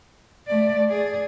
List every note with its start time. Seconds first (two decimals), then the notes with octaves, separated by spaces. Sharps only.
0.48 A3 D5
0.89 G#4 D5